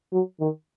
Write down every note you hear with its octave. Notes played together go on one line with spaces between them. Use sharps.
F#3
D#3